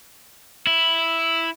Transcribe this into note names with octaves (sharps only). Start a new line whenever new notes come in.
E4